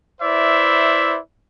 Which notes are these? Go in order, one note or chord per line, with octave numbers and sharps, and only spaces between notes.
E4 B4 C5 D5 E5